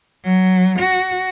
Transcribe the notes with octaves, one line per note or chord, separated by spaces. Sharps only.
F#3
F#4